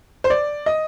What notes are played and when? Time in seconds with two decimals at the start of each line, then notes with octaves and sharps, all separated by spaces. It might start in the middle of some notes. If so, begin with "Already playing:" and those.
0.24 C5
0.30 D5
0.66 D#5